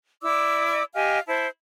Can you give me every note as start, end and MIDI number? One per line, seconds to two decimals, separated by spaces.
0.22 0.84 64
0.22 0.84 74
0.22 0.84 86
0.22 0.84 88
0.94 1.19 67
0.94 1.19 75
0.94 1.19 77
0.94 1.19 80
1.27 1.47 64
1.27 1.47 72
1.27 1.47 81